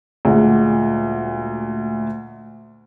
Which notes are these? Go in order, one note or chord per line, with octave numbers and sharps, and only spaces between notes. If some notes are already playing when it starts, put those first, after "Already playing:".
D2 A#2 G#3 F#5